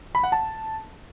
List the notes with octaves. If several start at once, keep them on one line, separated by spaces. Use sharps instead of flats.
B5
F#5
A5